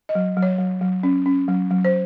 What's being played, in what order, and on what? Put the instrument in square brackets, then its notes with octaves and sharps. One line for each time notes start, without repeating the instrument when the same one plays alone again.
[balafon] D#5
F#3
F#3
C#5
F#3
F#3
C#4
C#4
F#3
F#3
C5